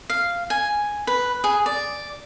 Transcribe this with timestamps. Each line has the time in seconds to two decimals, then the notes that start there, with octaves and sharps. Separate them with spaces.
0.10 F5
0.50 G#5
1.07 B4
1.44 G#4
1.66 D5